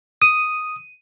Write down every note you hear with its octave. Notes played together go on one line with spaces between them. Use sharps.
D#6 D#7